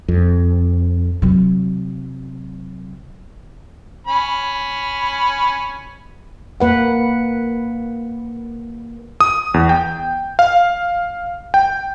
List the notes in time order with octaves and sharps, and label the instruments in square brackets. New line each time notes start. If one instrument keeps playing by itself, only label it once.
[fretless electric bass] F2
[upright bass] C3 F#3
[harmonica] C#4 B5
[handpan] A#3 B4 F#5
[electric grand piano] D#6
E2
G5
F5
G5